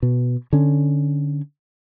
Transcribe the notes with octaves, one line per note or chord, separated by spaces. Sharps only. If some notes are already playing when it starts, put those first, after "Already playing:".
B2
D3 C#4